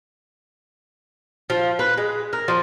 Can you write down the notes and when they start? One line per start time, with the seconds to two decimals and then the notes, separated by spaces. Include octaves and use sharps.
1.50 F3
1.79 B4
1.97 G#3
2.33 A#4
2.48 F3